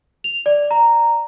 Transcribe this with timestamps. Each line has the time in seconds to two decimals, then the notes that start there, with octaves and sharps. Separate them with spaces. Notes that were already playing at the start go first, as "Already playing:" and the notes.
0.24 F7
0.46 D5
0.71 A#5